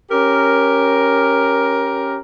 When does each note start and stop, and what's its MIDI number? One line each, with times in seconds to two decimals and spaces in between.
0.11 2.18 61
0.11 2.18 67
0.11 2.18 70